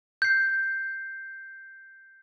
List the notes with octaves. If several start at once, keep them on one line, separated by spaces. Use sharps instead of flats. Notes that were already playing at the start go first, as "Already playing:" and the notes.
G6 C7